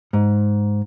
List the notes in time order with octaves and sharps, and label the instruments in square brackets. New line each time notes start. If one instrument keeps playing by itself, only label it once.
[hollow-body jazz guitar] G#2